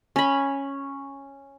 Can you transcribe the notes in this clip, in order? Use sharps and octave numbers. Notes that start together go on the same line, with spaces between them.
C#4 B5